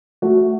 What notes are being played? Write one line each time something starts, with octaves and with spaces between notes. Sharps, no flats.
A3 F#4